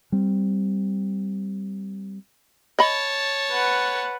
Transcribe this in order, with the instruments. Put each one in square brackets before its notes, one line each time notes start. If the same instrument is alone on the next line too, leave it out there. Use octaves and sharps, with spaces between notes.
[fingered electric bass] G3 C4
[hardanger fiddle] C#5 A5 [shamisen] D#5 B5
[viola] B4 F#5